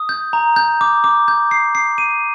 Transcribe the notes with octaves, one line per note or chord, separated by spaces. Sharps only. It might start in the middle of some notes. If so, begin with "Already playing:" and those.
Already playing: D#6
G6
A#5
G6
D6
D6
G6
C7
C7
D#7